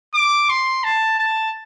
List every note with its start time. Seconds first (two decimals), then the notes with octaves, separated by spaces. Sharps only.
0.14 D6
0.49 C6
0.84 A5
1.19 A5